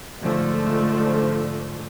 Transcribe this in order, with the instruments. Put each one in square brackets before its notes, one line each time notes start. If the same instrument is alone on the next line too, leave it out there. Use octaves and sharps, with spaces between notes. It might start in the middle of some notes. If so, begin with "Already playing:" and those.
[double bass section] G#2 D3 F3 A3